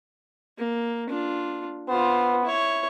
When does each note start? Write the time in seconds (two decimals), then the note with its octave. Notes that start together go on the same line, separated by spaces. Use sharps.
0.58 A#3
1.09 D4 F4
1.89 B3 F4 C5
2.44 E4 C#5